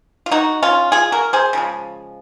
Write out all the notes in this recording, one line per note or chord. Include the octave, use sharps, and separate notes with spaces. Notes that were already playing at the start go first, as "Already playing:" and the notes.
F4
D#4 F#4
C#4 F4
F4 G#4
F#4 A#4
G#4 C5
C#3 F3 G#3